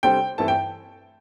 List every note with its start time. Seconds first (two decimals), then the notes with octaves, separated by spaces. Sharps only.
0.03 C3 G3 D4 A4 C5 G5
0.38 G2 E3 A3 C4 A5
0.48 G5